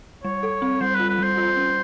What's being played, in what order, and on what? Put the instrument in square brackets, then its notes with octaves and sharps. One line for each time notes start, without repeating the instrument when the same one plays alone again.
[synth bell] G3 [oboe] C#5
[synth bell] A4
C4
[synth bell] G3 [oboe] C5
[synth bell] F4 [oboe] B4
[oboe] B4
[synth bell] G3 [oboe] C5
[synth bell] F4
C#4